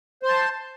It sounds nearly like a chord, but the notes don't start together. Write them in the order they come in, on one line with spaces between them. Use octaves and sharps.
C5 C6 A5